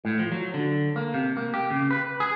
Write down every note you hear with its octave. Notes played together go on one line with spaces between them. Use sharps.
A2
F3
F#3
D3
A#3
C3
A#3
G4
C#3
B4
G#4